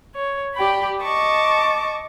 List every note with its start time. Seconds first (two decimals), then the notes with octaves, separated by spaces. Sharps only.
0.15 C#5
0.55 G4 D5 G5 B5
1.01 D#5 A5 C#6 D6